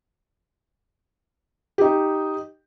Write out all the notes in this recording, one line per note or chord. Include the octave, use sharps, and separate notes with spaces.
D#4 G4